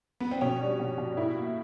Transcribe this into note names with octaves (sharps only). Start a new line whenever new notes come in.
B3
C4
B2 C#4
G3 D4
B2
B2
A2 E4
A#3